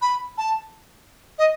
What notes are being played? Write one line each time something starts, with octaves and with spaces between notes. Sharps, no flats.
B5
A5
D#5